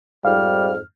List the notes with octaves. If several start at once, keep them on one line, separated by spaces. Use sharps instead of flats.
F2 G#2 G3 F5 F6